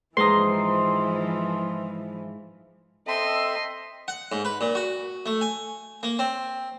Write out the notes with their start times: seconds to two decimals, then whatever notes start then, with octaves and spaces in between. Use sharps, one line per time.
0.17 G#2 E3 F3 B4 C5 A#5 C6 D#6
3.07 C4 A4 D#5 E5 C6
4.08 F#5
4.32 G#2
4.45 B4
4.61 A#2
4.75 F#4
5.26 A3
5.41 G#5
6.03 A#3
6.19 C4